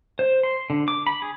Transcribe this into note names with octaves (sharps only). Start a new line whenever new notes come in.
C5
C6
D3
D6
B5
G#4